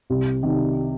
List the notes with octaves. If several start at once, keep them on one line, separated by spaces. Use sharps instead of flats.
C2
C3 D#3